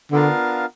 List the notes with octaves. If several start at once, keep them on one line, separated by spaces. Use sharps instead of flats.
D3 B3 D4 F4 A#4 F5